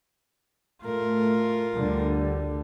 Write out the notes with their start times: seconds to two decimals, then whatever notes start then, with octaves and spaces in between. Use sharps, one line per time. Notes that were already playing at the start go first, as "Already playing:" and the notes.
0.83 A2 A3 F4 A#4
1.75 D2 D3 G3